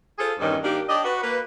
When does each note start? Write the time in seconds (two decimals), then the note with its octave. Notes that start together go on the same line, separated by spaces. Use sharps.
0.19 F4 G#4 A4 C5
0.40 E2 G2 D#3 C#4
0.64 D#3 A#3 D4 G4
0.89 D4 G4 C#5 D#5
1.04 F#4 B4
1.23 A#3 B4